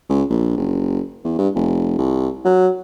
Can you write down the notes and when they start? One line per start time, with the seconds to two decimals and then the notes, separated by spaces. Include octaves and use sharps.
0.10 C#2
0.30 A#1
0.57 F#1
1.25 E2
1.38 G2
1.55 F1
1.98 C2
2.45 F#3